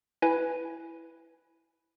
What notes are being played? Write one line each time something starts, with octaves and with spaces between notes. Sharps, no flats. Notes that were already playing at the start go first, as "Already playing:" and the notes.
E4 B4 G#5